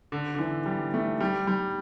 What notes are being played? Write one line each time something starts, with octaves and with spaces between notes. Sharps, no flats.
D3
D3
E3
G3
A3
G3
G3